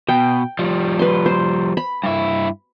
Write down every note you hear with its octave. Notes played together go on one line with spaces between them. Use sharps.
B2 G5
F3 G3
B4 C6
C5
B5
G2 E4